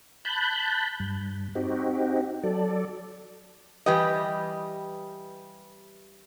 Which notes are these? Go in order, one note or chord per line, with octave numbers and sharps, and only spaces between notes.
A5 B5 F#6 G6
G2
C4 D#4 F#4 G4
F#3 A4 D5
E3 G3 G4 B4 D#5